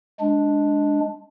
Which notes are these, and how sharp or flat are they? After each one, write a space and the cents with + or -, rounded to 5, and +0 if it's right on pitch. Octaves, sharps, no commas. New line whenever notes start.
G#3 +5 D4 +0